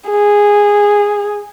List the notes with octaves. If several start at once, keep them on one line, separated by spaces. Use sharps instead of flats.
G#4